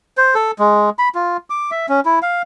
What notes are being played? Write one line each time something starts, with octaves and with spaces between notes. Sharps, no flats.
C5
A4
G#3
B5
F4
D6
E5
C#4
E4
F5